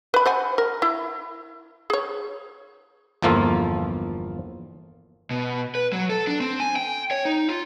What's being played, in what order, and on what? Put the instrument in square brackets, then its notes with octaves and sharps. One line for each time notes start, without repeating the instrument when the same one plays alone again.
[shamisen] B4 B5
C5 F#5 G#5
A#4
E4
G#4 C#5
[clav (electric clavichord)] G1 E2 F3 A#3 F4 A4
[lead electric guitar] B2
B4
F#3
A4
D4
C4
G#5
G5
C#5
D#4
F4